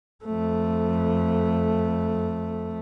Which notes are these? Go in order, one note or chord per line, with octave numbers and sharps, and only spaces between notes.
F2 A3